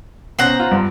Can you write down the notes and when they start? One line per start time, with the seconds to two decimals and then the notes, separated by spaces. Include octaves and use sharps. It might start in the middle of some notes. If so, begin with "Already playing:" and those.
0.39 B2 C#4 C5 F#5 A#5
0.60 F4
0.71 G2